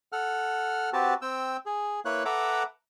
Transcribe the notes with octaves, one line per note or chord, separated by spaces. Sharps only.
A4 F#5 F6
C4 F#4 G4 B4 A5
C4 G5 E6
G#4
A#3 E4 B4 C#5 F#6
A4 B4 E5 F#5 A#5 D6